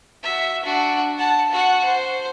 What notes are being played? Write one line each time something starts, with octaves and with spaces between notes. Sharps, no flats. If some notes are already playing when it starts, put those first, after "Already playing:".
F#4 E5
D4 F#4
F#5 A5
F#4 F#5
C5